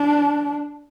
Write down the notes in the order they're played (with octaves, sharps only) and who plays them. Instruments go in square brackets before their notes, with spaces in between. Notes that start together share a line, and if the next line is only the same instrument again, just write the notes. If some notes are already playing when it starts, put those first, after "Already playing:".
Already playing: [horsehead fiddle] D4